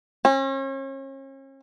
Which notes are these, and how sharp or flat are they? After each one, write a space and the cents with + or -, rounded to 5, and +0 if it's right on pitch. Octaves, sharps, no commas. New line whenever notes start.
C#4 -40